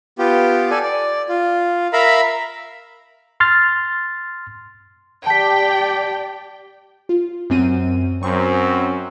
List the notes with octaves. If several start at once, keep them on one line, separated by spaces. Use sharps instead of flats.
B3 F4 G4
A4 D5 G#5
D5
F4
A#4 E5 F5 A#5 B5
C6 F6 A6
G4 D5 G5 A5 B6
F4
F#2 C4 D#7
F#2 C4 C#6